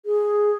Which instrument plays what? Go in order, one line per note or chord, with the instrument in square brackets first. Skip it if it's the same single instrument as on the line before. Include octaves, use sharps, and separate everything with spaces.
[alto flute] G#4